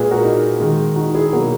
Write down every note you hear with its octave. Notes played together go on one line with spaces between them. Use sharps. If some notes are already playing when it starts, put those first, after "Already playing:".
Already playing: A#2 G#3 G#4 B4
F#4 A#4
D#4
D#3 G#3
D#4 F#4
E4 G#4
B2 F#3 A#3 F#4 A#4